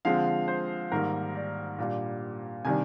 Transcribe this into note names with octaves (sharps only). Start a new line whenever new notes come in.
D3 F3 G#3 C4 F5
C5
G#2 D#3 G3 A#3 A#4
D5
A#2 G3 D4
C3 D#3 G3 D4 G#5